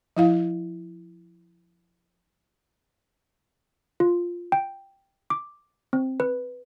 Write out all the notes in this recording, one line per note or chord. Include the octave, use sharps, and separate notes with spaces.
F3 E4 F5
F4
G5
D6
C4
B4